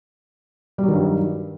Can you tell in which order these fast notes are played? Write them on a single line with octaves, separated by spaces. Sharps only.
G3 F#3 D#3 G2